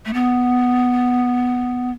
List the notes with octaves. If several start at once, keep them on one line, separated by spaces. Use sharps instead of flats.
A3
B3